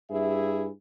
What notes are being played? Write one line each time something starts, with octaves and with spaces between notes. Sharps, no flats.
G2 E4 G#4 E5